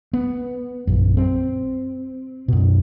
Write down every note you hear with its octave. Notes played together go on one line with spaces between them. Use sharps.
B3
A#1 F#2
C4
F#2 B2